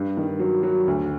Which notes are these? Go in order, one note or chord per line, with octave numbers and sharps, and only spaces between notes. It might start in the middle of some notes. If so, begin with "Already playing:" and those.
Already playing: G2
D#3
F#3
F#3
D2